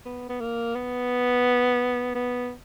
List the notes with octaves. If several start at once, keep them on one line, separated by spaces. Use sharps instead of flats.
B3
B3
A#3
B3
B3